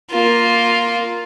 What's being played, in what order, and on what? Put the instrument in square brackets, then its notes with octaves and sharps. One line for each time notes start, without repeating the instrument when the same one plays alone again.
[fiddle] A#3 F4